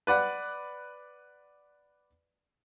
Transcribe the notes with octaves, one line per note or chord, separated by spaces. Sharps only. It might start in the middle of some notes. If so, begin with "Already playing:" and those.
B4 D5 F#5